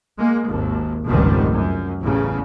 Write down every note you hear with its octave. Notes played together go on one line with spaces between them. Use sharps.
G#3 A#3
G#1 D#2
F1 C#2 G#2 D#3 G3
F#2
A1 E2 C#3